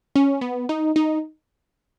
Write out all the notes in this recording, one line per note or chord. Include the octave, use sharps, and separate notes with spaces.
C#4
B3
D#4
D#4